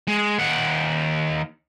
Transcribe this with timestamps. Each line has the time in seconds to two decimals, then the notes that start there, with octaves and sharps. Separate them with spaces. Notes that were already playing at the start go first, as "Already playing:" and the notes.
0.07 G#3
0.38 D#2 F#5